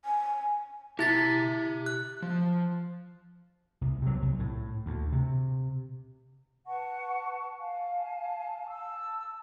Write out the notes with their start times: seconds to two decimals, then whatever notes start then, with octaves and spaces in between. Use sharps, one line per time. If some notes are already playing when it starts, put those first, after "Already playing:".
0.05 G#5
0.99 E4 G4 E5 A6 B6
1.86 F#6
2.22 F3
3.81 C2
4.02 C3 F#3
4.22 C2
4.39 A2
4.86 D2
5.12 C3
6.66 B4 F#5 A5 C#6
7.58 F5 G#5 A5
8.70 A5 E6